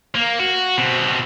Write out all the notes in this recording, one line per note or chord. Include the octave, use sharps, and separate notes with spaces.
A#3
F#4
B2 C4